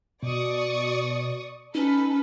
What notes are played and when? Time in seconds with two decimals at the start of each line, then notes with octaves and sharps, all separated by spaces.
0.22 B2 D5 C#6 D#6
1.75 C#4 D#4 A4 B4